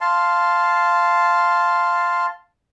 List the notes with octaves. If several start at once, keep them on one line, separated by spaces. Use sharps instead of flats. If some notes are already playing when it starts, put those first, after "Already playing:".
F5 A5 C6